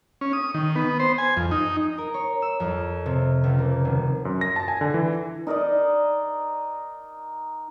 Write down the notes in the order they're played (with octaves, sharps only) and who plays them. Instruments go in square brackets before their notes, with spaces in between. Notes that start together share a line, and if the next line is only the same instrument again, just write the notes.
[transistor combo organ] C#4
D#6
D#3
B3
C5
G#5
F2
D#4
[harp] A#4
C#5
E6
F2
C3
C#2
A#3
D#1
[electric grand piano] F#2
A#6
A5
G#5
D3
E3
[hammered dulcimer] D#4 A#4 D5 D#5